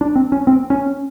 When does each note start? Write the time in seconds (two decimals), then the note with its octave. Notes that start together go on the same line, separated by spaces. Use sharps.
0.01 D4
0.16 C4
0.32 C#4
0.47 C4
0.70 C#4